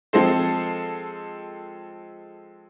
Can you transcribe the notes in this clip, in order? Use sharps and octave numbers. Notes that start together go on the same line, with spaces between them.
F3 G#3 C4 A4 C5